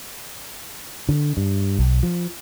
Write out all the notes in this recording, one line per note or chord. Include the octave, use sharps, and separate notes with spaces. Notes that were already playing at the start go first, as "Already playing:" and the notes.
D3
G2
B1
F3